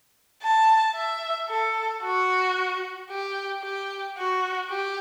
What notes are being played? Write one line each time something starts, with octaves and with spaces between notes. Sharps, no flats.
A5
E5
A4
F#4
G4
G4
F#4
G4